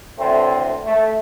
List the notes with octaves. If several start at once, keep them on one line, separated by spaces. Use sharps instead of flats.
D2 A2 D3 E3 A3 C4
A3